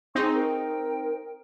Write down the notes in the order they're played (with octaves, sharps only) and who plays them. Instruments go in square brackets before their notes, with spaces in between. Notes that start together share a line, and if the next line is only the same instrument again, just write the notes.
[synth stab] C4 D#4 [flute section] G#4 C#6
[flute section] A#4 G5